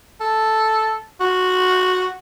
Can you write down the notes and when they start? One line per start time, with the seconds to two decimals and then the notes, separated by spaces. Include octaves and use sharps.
0.21 A4
1.20 F#4